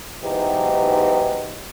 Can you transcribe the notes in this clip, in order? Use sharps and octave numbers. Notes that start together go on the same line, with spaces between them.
G#2 B2 E3 F#3 D#4 G4